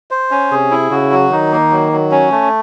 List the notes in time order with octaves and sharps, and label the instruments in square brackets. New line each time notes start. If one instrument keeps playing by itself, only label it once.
[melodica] C5
C#4
[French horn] C3 [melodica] G#4
[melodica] E4
[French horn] C#3 [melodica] F#4
[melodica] F#3
[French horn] D#3 [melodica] D#4
[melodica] A#3
F#3
F#3
C#4
A3